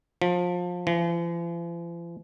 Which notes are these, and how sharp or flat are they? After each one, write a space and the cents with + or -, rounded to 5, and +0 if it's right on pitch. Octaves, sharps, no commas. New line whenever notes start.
F3 +25
F3 -45